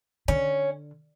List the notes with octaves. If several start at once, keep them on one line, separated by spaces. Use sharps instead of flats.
D3 C#4